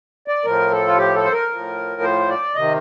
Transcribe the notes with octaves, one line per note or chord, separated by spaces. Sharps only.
D5
A2 F3 A#4
A4
F4
G4
A4
C5
A#4
A2 F3
C5
D5
C3 D#3 D#5